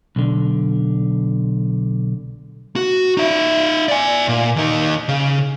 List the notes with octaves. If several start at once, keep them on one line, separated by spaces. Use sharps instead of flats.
B1 D3
F#4
D#4 E5
D5 G#5
A#2
D#2 D#4
C#3